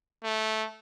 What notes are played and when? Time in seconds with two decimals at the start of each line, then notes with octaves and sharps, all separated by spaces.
0.24 A3